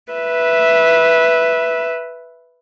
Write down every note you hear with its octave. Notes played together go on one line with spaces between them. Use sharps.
B4 E5